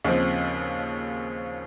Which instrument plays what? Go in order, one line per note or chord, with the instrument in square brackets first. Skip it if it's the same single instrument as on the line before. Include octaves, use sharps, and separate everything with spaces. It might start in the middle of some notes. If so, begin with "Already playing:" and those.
[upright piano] D#2 C#3 F3 C4